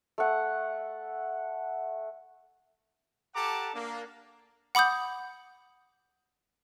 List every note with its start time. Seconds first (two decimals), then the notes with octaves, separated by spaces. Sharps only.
0.18 A3 F#5
3.35 G4 A4 F#5 A5 A#5 D6
3.74 A#3 D4
4.75 F#5 B5 D6 D#6 G6